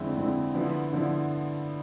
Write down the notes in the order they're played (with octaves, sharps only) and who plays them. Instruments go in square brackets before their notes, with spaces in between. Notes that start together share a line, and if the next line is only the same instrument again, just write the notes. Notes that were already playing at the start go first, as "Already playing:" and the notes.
Already playing: [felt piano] F2 D3 G#3 C4 E4
F2 D3 G#3 C4 E4
D3 F3 B3 E4
D3 F3 B3 E4